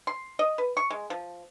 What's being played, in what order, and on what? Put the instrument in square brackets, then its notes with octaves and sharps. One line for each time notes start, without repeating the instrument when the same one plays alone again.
[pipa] C6
D#5
B4
C#6
G#3
F3